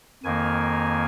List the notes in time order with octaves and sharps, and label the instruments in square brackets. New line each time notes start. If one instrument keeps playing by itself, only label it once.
[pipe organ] F2 D#3 A#3 G#5